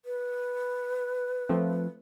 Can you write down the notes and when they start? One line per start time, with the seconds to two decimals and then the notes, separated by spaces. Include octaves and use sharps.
0.05 B4
1.49 F3 A3 C4